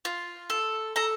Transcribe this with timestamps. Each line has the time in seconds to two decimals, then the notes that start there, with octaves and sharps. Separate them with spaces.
0.05 F4
0.50 A4
0.96 A4 A#5